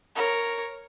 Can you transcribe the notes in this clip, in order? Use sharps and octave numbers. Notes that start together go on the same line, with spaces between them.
A#4 C#5